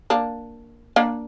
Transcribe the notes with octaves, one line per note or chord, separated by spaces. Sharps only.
A#3 D4
A#3 D4